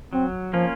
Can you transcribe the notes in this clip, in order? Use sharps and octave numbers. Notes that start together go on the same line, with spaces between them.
F#3 C4
F3 A#3 C#4 F4